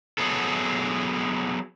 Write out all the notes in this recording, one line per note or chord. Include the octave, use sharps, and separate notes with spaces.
F#3 B3 G#4 A4